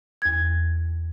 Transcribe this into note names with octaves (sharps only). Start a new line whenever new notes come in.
E2 G#6